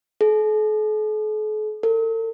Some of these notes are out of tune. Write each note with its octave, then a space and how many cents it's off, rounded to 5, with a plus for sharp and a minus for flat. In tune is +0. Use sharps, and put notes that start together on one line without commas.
A4 -45
A4 +45